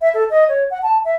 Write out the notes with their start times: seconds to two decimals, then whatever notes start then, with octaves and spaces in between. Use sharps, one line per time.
0.01 E5
0.14 A4
0.30 D#5
0.48 C#5
0.70 F#5
0.83 A5
1.05 E5